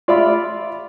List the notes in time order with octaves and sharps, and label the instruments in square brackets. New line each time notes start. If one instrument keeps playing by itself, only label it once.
[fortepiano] F4 D5 E5 B5